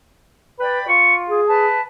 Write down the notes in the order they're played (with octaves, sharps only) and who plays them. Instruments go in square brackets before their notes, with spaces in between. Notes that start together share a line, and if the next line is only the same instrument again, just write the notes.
[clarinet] B4 [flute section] D5 G5 B5
[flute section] F4 [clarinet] C#6
[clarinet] G#4
[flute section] B4 A5